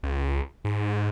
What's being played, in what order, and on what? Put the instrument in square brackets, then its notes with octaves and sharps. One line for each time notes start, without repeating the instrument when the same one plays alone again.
[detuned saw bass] C#2
G#2